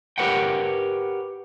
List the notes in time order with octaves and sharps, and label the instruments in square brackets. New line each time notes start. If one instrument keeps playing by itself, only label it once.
[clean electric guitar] G4 A#4 B4 C#5 F#5 G5